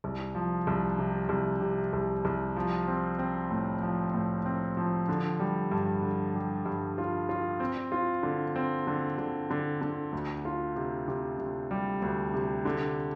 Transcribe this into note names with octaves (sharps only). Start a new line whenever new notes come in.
C2
F3
C2
C3
C2
C3
C2
C2
F3
C4
C4
A2
F3
A2
C4
F3
D3
G3
G2
D3
G3
G2
F4
F4
C4
F4
D3
C4
D3
D3
D3
D3
D2
F4
C3
C3
C3
G3
D2
C3
D3